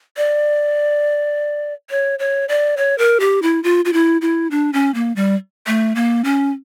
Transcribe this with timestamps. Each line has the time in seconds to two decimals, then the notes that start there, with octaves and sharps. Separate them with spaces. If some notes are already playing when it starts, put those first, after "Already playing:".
0.17 D5
1.90 C#5
2.19 C#5
2.49 D5
2.77 C#5
2.98 A#4
3.20 G4
3.42 E4
3.64 F4
3.85 F4
3.93 E4
4.21 E4
4.51 D4
4.73 C#4
4.94 A#3
5.16 G3
5.67 A3
5.95 A#3
6.24 C#4